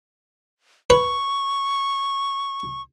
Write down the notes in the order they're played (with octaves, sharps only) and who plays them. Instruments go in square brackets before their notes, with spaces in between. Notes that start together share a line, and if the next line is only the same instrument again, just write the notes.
[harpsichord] B4 [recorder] C#6